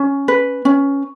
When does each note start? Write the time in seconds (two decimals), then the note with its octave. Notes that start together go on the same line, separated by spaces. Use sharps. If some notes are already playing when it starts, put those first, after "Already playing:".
Already playing: C#4
0.28 B4
0.65 C#4